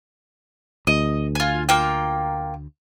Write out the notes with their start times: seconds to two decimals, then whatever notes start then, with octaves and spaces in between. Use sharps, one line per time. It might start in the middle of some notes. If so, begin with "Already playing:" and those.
0.87 D2 D#5
1.35 F4 G#5
1.69 A#3 F4 G5